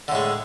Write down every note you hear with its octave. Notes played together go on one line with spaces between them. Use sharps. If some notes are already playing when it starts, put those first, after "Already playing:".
A2 D3 G#3